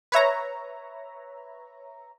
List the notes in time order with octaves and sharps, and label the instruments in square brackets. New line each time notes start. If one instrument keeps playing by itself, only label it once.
[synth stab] B4 C#5 E5 A#5